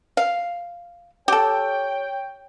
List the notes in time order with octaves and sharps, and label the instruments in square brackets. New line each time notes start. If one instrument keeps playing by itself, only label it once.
[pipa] F5
[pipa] G4 A4 [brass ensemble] C#5 G5